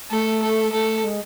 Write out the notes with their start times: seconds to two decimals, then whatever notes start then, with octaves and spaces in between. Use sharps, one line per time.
0.11 A3 A4
0.42 A4
0.72 A3 A4
1.04 G#3